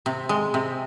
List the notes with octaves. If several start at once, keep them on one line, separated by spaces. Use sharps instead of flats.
C3
G#3
C3